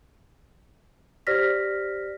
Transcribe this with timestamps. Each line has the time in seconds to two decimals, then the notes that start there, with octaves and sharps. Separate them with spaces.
1.27 G4 C5 D5 F6 A#6 B6